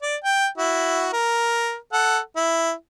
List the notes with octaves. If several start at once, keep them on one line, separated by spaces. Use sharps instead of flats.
D5
G5
E4 F#4
A#4
A4 F#5
E4